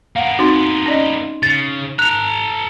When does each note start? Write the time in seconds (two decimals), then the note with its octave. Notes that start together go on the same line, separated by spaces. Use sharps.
0.16 A#3 B3 F5 F#5
0.39 C4 D#4 F#4 C6
0.86 C#4 D5 D#5
1.43 C#3 A6
1.99 A4 A#5 F#6 F7